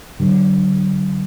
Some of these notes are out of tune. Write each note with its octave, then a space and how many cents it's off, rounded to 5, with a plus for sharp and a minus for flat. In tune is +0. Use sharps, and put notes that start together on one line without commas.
D3 +0 F#3 +35